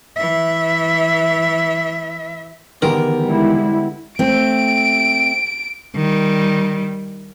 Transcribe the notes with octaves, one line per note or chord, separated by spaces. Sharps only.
E3 E5
E2 D3 D#3 B3 G4 A#4
G3 G#3 E4
A3 C4 D7
D#3 G3